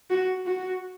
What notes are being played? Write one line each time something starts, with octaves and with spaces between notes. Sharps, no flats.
F#4
F#4